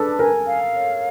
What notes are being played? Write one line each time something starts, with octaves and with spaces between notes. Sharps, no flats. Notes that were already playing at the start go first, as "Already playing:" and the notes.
Already playing: D4 G#4 A4 B4
A#4 G#5
F5
C#5